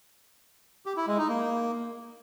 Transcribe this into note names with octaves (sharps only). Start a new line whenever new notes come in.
G4
E4
G#3
D#4
A#3